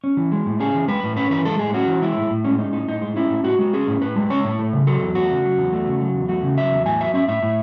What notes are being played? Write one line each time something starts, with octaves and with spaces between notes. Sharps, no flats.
C#4
E3
G#3
A2
C#4 G#4
E3
G#3 B4
A2
C#4 B4
E3 B4
G#3 A4
A2 G#4
C#4 F#4
E3
G#3 E4
A2
A2
G#3 C#4
C#4 D#4
A2 D#4
A2 D#4
G#3
C#4 E4
A2
A2 F#4
G#3 F#4
C#4 G#4
A2
A2 B4
G#3
C#4 C#5
A2
A3
C#3
F#3 A4
E2
A3 F#4
C#3
F#3
E2
A3
C#3
F#3
E2
A3 F#4
C#3
F#3 E5
E2
A2 G#5
F#3 E5
C#4 E5
A2 E5
A2